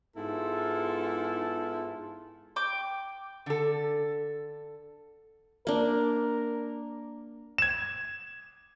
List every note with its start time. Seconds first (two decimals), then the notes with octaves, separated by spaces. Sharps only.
0.17 G#2 B3 E4 F4 A4
2.56 G5 D6
3.46 D3 A4
5.67 A#3 D4 A#4
7.58 G#6 E7